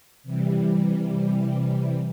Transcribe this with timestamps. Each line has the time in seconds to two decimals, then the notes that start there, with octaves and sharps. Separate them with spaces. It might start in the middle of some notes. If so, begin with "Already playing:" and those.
0.23 C3 E3 G3